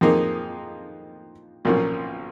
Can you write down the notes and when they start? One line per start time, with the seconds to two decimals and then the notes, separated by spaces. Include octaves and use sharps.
0.01 F2 F3 A#3 D#4 G#4
1.65 B1 A#2 F3 A#3 C#4